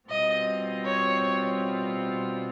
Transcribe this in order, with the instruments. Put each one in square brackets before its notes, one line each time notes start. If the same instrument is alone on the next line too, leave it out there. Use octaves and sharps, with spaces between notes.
[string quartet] B2 G3 C4 F4 [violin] D#5
[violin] C#5